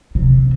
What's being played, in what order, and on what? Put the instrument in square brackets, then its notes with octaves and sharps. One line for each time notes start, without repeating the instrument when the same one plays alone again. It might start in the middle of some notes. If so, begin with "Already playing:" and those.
[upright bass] C3